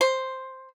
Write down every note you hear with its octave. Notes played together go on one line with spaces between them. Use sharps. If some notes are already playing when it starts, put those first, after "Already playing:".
C5